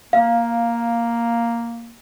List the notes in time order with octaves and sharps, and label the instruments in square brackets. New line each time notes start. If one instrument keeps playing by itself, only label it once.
[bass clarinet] A#3 [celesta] F5